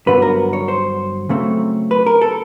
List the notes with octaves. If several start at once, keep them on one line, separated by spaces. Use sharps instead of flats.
G2 D3 F#3 B3 B4
A#4
C#5
C5
C#3 F#3 A3 C4
B4
A#4
A4